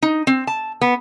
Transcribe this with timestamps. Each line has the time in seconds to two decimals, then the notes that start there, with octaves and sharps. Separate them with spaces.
0.02 D#4
0.27 C4
0.47 A5
0.81 B3